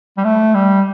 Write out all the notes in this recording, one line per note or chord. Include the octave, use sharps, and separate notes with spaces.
G3
A3
G3